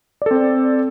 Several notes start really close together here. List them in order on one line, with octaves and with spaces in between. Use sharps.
D5 A4 C4